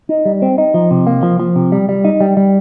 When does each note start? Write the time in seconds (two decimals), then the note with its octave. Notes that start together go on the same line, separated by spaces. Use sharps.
0.09 D#4
0.25 G3
0.42 C4
0.58 D#4
0.74 F3
0.91 C3
1.07 A#3
1.23 F3
1.40 F3
1.56 C3
1.72 G3
1.89 G3
2.05 D#4
2.21 G3
2.37 G3